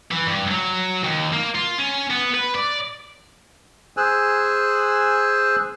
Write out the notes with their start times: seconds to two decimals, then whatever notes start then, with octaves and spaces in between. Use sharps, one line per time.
0.12 E3
0.27 G2
0.51 F#3
1.03 D#2
1.33 A#3
1.55 F4
1.78 C#4
2.11 B3
2.35 B4
2.55 D5
3.97 G#4 C5 G#5 E6 F#6